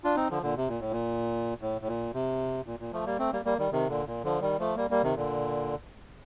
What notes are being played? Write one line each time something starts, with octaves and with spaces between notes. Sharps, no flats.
D4 F4
C4 D#4
D3 F3
A#2 D3
C3
A#2
A2
A#2
A2
A2
A#2
C3
A#2
A#2
F3 A3
G3 A#3
A3 C4
G3 A#3
G3 A#3
D#3 G3
C3 D#3
A#2 D3
A#2
D3 F3
D#3 G3
F3 A3
G3 A#3
G3 A#3
C3 D#3
A#2 D3